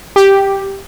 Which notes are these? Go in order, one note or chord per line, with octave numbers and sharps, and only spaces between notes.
G4